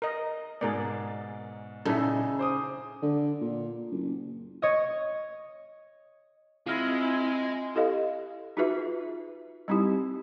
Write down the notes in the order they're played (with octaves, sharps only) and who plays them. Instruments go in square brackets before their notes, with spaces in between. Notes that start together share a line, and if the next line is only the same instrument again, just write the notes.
[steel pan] A#4 D#5
[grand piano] G#2 B2 [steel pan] G#4 A#4 D5
[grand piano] A#1 D#4 G#4 [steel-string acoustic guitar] C#3 [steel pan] E4 A4
[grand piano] C5 D6 D#6
[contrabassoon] D3
A#2
F#1
[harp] C#5 D#5
[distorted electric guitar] G#3 [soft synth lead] C4 [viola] E4 [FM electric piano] F4 F6 A#6
[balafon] E4 G4 A4 D#5 F5
D#4 F4 F#4 G#4 B4 E5
G3 C4 D#4 E4 G4